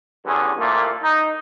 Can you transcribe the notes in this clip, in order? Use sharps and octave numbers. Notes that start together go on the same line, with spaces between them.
E2 G2 D3 C#4 G#4
C2 A#2 A3 A#3
D#4